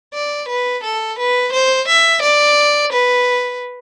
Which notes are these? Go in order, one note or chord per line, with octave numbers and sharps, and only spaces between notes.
D5
B4
A4
B4
C5
E5
D5
B4